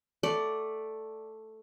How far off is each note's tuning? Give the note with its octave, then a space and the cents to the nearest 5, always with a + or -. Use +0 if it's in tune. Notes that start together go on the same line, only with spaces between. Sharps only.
A3 +0 D5 +0 F#5 +35